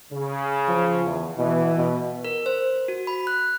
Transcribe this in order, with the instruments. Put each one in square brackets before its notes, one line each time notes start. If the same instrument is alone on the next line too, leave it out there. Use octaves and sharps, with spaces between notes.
[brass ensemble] C#3
[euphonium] F3
E2
[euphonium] B2 [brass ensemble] E3
[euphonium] B2
[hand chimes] A#4
C5
F#4
B5
F#6